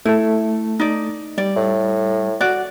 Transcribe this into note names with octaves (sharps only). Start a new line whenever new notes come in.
A3 E4 A4
D#4 D5
G3 D5
A2
F#4 D5 F#5